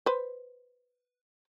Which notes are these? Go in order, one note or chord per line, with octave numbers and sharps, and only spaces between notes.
B4 C5